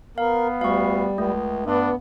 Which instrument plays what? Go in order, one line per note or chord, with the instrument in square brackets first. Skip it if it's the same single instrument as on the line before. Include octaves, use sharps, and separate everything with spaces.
[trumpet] B3 [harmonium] A#4 [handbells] F5
[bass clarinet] D2 [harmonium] G3 [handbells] F5 C#6
[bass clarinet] C#2 [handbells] A3
[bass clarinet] G2 [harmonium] B3 [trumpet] D4